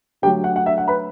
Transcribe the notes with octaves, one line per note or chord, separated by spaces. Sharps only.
D3 F#3 A3 G4 G5
F#5
F#5
E5
F#5
B4 B5